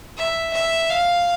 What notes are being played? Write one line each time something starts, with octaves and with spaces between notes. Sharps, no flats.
E5
E5
F5